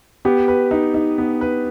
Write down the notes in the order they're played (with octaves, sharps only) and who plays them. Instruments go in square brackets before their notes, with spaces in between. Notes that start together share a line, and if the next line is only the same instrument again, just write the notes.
[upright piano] B3 [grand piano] G4
[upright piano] B4
D#4
D#4
B3
B4